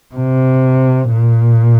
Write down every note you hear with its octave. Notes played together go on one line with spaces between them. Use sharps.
C3
A#2